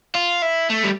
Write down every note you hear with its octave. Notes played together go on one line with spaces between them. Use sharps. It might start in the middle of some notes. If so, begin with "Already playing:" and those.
F4
E4
A3
G3